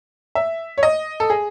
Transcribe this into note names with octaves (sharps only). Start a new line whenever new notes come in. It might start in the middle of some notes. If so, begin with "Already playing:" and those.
E5
C#5
D#5
A4
G#4